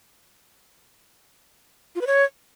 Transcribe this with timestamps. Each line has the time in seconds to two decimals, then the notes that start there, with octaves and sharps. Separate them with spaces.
1.95 F4
2.01 B4
2.07 C#5